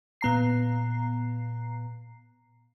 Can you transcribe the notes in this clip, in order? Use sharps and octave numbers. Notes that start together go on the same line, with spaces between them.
A#2 B3 A#5 C7